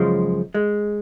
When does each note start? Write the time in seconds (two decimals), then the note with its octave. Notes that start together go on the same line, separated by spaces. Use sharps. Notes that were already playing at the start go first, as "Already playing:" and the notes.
Already playing: F#2 C#3 F3 G#3
0.54 G#3